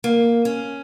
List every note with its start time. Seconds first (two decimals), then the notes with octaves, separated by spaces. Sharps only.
0.04 A#3
0.45 C#4